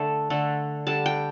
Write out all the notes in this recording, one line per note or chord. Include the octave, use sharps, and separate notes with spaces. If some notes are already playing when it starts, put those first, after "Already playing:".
Already playing: D3 A3 A5
D3 A3
D3 G3 A5
G5